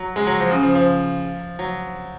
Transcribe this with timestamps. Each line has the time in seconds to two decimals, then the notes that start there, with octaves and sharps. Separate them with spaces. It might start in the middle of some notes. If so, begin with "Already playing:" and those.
Already playing: F#3
0.16 G#3
0.27 F#3
0.40 F3
0.51 C#3
0.63 F3
0.75 F3
1.59 F#3